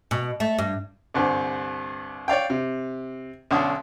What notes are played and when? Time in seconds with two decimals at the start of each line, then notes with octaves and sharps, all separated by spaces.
0.11 B2
0.40 A3
0.59 G2
1.14 C2 G2 D3 C4
2.28 C#5 D5 F5 G5
2.50 C3
3.51 B1 D3 C#4 D4 D#6